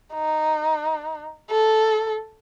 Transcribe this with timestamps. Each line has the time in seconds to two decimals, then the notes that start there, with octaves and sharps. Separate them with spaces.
0.14 D#4
1.50 A4